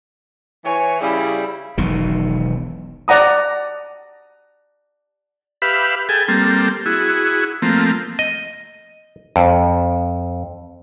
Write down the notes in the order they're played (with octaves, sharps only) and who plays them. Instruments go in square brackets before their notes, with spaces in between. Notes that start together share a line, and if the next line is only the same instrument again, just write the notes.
[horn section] E3 C#5 [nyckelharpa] G#5
[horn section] C#3 G3 G4 [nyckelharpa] E4 G#4
[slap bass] E1 B1 B2 D#3
[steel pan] D5 F#5 A#5 D#6
[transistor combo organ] G4 B4 E5 F5 B5
G#4 A4 G5 G#5
G3 A#3 C4 A4
E4 F#4 G#4
F3 A3 A#3 C4
[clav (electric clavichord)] D#5
F2